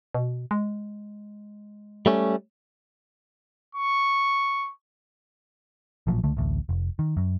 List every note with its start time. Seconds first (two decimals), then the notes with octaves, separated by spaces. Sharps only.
0.15 B2
0.51 G#3
2.06 G3 A3 C#4
3.75 C#6
6.07 A1 A#2 F3 F#3
6.23 C#2 D3 A3
6.37 A1 D2
6.69 F1
6.99 D#3
7.17 F#2